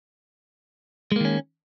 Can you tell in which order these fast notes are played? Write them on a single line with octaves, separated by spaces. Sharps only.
G#3 A#3 D#3 C#4